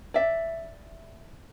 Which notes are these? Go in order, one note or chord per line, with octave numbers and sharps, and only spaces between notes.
D5 E5